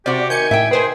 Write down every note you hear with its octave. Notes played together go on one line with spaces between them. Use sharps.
C3 F#4 G4 C5 D5
D#3 G#5 G6 C#7
A2 E5 G5
D#3 G#4 B4 C5 G#5